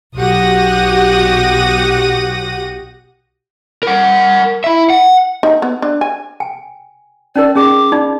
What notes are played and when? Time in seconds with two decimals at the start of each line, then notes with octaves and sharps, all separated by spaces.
0.17 B1 F#4 G4 F#5 D#6 A#6
3.83 A#4 F#5
4.64 E4 E5
4.90 F#5
5.43 D#4
5.62 B3
5.82 D4
6.01 G#5
6.40 G5 G#5
7.36 C#4 D#4 A#4 D5
7.56 C#4 G#4 D6
7.92 D#4 F4 D5